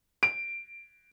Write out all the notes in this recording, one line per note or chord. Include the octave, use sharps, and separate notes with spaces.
D7